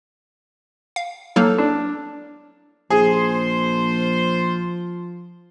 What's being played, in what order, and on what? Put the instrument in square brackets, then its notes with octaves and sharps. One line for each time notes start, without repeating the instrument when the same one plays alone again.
[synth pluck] F5
[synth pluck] F#3 A#3 D#4 [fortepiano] A4 F6
[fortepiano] D4
[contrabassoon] A#1 [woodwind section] F3 F4 [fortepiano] G#4 [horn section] C5